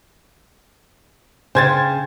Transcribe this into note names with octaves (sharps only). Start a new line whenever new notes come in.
C#3 C5 G5 G#5 G#6 A6